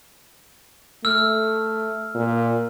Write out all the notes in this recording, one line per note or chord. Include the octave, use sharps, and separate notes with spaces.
A3 E6 F6
A#2